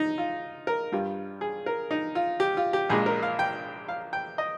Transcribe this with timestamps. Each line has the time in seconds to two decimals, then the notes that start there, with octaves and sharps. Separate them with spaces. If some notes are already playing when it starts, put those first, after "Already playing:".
Already playing: D#4
0.18 F4
0.67 A#4
0.92 G2 G3 F4
1.41 G#4
1.66 A#4
1.91 D#4
2.15 F4
2.40 G4
2.57 F4
2.73 G4
2.90 A#1 A#2 G#3 G#4
3.06 A#4
3.23 F5
3.39 G5
3.88 F5
4.13 G5
4.38 D#5